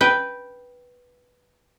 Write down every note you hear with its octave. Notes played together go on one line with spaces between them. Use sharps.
B4 G5